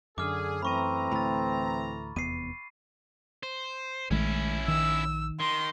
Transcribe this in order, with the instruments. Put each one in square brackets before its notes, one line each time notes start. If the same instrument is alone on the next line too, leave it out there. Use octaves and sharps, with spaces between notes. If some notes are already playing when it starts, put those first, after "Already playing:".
[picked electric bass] F#2 [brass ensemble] D3 G#4 [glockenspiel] D6 F6
[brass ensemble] E3 A3 A#5 [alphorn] C4 [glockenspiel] B5 C#6 D#7
[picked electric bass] D2 A2 [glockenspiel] B5 A6
[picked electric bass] F1 E2 B3 [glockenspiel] C7 D#7
[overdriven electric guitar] C5
[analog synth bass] A#1 [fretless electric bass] D#3 G#3 A3 [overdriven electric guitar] C#4 E4
[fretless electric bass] D#3 [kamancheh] E6
[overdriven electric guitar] D#3 [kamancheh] C6